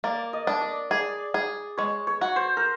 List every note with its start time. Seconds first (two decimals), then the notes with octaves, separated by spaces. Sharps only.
0.04 A#3 D5
0.33 D#5
0.47 D4
0.61 D5
0.91 G#4 D5
1.34 G#4
1.77 G#3 C#5
2.07 C#5
2.21 F#4
2.36 C5
2.57 A#4